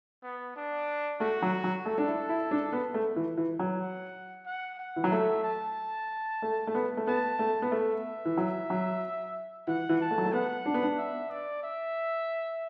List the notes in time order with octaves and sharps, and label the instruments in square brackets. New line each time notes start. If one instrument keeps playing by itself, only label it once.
[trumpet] B3
D4
[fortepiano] A3 [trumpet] F#4
[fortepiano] F#3
F#3
[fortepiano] A3 [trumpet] A4
[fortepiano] D4
E4
E4
D4
B3
A3
E3
E3
F#3
[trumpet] F#5
F#5
F#5
[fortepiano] E3
F#3
[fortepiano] A3 [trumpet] E5
[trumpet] A5
[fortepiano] A3
A3
B3
A3
[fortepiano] B3 [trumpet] A5
[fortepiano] A3
B3
[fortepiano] A3 [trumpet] E5
[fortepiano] E3
F#3
F#3
[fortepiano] E3 [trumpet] F#5
[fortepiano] E3
[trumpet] A5
[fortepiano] A3
F#3
A3
[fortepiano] B3 [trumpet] F#5
[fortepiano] D4
B3
D4
[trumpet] E5
D5
E5